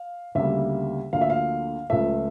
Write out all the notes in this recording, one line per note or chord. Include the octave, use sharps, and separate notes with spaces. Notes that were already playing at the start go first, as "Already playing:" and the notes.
Already playing: F5
D2 C#3 G3 A#3 E5
D2 D3 F3 A#3 F5
E5
F5
C#2 C#3 F3 A3 E5